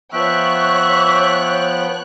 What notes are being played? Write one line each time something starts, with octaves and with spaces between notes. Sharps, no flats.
F3 B3 C#5 E5 G5 C#6 F#6